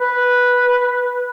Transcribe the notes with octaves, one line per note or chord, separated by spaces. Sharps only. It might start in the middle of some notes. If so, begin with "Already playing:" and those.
B4